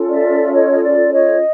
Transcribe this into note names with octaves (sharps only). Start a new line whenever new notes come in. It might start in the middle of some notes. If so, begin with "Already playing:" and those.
Already playing: C#4 F4 A4
D5 E5
C#5 D#5
D#5
D5
C#5 D#5